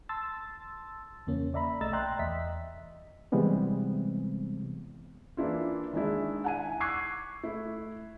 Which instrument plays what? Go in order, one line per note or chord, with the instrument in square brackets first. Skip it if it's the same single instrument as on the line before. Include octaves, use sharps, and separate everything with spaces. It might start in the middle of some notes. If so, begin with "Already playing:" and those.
[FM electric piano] A5 C6 E6 A6
E2 C#3 A#3 C#4
D5 E5 A#5 B5
B1 A3 D#5 A#5 E6 A6
D5 G5 A#5 C6 F#6
E2 D#5 E5 B6
[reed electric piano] C3 E3 G3 G#3 B3 C4
[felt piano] E3 A#3 D4 E4 F4
D#3 G#3 D4 E4
F#5 G#5 D#7
C#6 D6 E6 F#6 G#6 C7
A3 E4